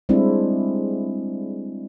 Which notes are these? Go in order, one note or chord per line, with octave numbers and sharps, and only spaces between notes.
G3 G#3 C4 D4 E4